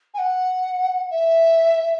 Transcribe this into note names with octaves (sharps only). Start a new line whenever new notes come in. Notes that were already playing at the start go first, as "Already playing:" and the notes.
G#5
F#5
E5